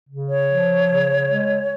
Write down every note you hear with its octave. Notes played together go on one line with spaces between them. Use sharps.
C#3
C#5
F3
C#3
G#3